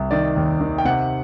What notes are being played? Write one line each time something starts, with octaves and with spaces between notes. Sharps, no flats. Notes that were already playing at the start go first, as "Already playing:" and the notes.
Already playing: C2
D#3 D5
D#2
D#3
G5
C3 F#5